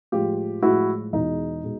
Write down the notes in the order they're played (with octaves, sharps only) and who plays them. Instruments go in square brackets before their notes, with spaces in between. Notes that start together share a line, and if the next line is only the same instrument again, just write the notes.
[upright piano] A2 F3 G#3 F4 G4
A2 F3 G#3 E4 F#4
E2 B2 G#3 D#4
B2 G#3